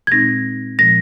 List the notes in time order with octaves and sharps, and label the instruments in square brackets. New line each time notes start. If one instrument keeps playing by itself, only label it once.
[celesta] G#6
[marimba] A#2 G#3 C4 D#4 [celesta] A#6
[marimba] A#2 F3 G#3 [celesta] A#6